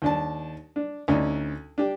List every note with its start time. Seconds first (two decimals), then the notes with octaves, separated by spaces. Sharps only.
0.02 D#2 D4 A5
0.76 D4
1.08 D2 C#4 D#4 D5
1.78 D4 G4